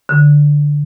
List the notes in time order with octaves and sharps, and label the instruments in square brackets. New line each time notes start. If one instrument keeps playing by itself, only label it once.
[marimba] D3